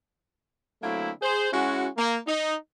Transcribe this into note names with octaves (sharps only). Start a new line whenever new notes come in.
D3 F#3 A3 A#3 C4 E4
G#4 C5
G#3 C#4 E4 F#4
A#3
D#4